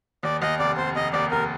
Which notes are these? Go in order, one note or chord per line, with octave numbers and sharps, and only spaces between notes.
D#2 D5
D#2 D#5
F1 D5
F1 C5
F1 D#5
D#2 D5
F1 A#4